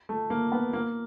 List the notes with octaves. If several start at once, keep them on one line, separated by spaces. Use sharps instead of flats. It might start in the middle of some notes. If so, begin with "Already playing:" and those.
A3
A#3
B3
A#3